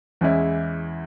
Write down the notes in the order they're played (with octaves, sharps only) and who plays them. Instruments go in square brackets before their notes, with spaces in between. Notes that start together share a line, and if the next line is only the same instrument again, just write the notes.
[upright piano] E2 E3 G#3 C#4 E4